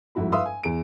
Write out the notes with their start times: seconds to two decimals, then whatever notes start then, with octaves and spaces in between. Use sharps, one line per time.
0.15 G1 F2 G#2 E4 F#4 B5
0.32 B4 E5 F5 C6 D#6 E6
0.46 G#5
0.63 E2 G#4 D7